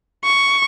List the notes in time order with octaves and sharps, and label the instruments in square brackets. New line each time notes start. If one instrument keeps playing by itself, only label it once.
[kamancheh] C#6